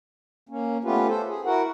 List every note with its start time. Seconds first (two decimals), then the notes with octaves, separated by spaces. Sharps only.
0.49 A#3 C#4
0.84 A3 B3 C#4 F4 G4 B4
1.08 A4 C5
1.27 G#4
1.45 E4 F#4 A#4 F#5